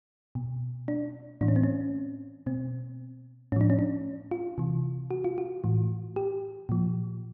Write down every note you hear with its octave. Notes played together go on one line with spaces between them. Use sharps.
B2
D4
A2 E3 D4
C#4
C4
C#4
B2 C4
A2 F3 C#4 D4
C#4
D4
F4
C3 E3
F#4
F4
F#4
A2 E3
G4
A#2 F3